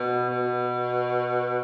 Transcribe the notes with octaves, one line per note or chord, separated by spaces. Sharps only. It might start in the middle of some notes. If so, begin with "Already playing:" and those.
Already playing: B2
B2